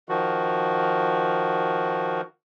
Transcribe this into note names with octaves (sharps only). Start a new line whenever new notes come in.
D#3 F3 F#4